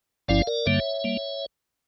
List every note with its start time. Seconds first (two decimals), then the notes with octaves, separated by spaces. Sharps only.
0.28 G1 G2 F3 C#4 E4 D5 F5
0.47 A#4 D5
0.66 G2 D3 G3 A#3 C#5 E5
1.04 G3 A#3